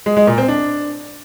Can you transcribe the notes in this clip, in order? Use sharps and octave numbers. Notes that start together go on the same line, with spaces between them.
G#3
G#3
A#2
C4
D4